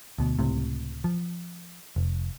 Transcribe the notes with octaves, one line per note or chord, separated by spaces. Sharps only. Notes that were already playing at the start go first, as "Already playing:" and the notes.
D2 B2
C#2 A2 C3
F3
F1